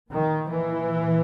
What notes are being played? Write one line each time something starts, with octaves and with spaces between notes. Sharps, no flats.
A#2 D#3
E3